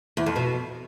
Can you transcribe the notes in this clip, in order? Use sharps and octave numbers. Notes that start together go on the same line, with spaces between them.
E2
F2
B2